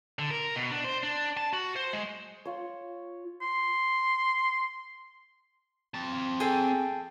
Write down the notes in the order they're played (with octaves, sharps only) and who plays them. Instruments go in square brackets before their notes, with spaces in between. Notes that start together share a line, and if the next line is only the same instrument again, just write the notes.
[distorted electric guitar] D3
A#4
B2
D4
C5
D4
A5
F#4
C5
G#3
[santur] F4 C#5
[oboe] C6
[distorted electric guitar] C4 A5
[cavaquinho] G#4 A4 G5